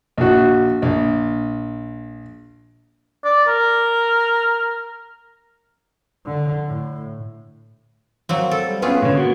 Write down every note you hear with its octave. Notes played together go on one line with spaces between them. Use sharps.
A#1 F#4
A#1
D5
A#4
D3
A2
F#3 A#3 C4
A4
G3
A3 B3 C#4 F4 G#4 B4
A2 D3 C#5
A#3 B3 F#4